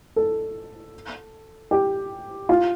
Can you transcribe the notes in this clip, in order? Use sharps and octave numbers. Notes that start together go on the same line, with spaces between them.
A4
G4
F4